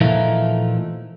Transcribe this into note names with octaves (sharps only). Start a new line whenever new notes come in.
A#2 E3 F3 A3 A#3 D#4